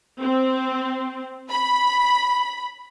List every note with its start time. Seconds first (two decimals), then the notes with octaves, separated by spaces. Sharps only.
0.20 C4
1.50 B5